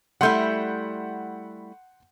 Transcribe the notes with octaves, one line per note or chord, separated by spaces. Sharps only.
G3 A3 E4 F#5 C6 G6